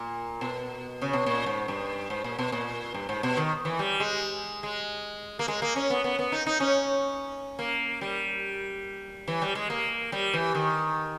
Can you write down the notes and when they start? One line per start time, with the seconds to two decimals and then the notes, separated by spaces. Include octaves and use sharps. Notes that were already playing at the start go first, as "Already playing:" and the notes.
Already playing: A#2
0.41 B2
1.02 C#3
1.13 B2
1.26 A#2
1.46 G#2
1.68 G2
2.10 G#2
2.24 A#2
2.39 B2
2.52 A#2
2.94 G2
3.09 G#2
3.23 B2
3.37 D#3
3.65 E3
3.79 G3
4.00 G#3
4.63 G#3
5.39 A#3
5.48 G#3
5.62 A#3
5.76 C#4
5.90 B3
6.04 B3
6.19 B3
6.32 D#4
6.46 D#4
6.60 C#4
7.59 A#3
8.01 G3
9.28 E3
9.42 G3
9.55 G#3
9.70 A#3
10.12 G3
10.33 E3
10.55 D#3